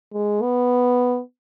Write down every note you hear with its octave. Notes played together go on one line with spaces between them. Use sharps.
G#3
B3